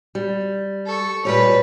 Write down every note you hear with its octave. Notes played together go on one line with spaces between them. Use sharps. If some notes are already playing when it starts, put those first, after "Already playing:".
G3
A4 C#6
A#2 G3 B4 C#5